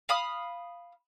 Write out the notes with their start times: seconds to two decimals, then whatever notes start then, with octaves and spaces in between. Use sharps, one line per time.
0.09 F5 B5 D#6